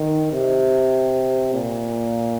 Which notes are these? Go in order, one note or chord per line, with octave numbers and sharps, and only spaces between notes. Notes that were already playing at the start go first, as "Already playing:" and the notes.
Already playing: D#3
C3
A#2